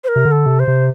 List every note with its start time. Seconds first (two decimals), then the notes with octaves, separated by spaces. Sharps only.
0.04 C5
0.08 A#4
0.16 C3
0.25 D3
0.31 A4
0.46 C3
0.60 C5
0.68 C3